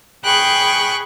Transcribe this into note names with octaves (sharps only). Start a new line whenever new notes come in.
G#4 G5 B5 C#6 F#6